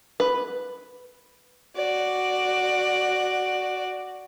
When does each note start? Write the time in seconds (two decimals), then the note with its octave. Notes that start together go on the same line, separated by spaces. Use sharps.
0.20 B4
1.76 F#4 D5